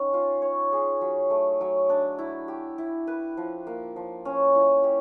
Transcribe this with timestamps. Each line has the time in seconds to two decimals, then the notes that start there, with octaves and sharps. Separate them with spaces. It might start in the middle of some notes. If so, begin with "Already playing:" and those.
Already playing: C#4 D#4 G4
0.13 F4
0.42 C#5
0.72 G#4
1.01 F#3
1.30 A3
1.61 F#3
1.89 D4
2.18 E4
2.48 G4
2.78 E4
3.07 B4
3.37 F3
3.67 A#3
3.96 F3
4.25 C#4
4.55 E4
4.84 G4